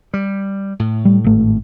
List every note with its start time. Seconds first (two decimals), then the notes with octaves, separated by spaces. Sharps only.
0.14 G3
0.79 A2
1.05 G3
1.24 G#1 A3